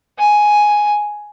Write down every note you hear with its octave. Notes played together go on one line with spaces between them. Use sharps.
G#5